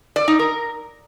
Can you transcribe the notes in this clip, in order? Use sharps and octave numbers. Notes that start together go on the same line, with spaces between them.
D5
D#4
A#4